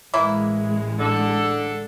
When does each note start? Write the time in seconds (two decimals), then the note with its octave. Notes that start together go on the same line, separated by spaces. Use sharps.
0.14 A1 E3 G#3 A#3 E4
1.00 D3 A4